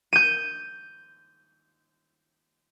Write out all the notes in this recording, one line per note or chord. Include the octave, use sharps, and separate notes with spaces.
G6 D#7